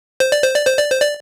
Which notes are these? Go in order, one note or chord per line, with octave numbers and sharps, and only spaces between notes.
C5
D5
C5
D5
C5
D5
C5
D5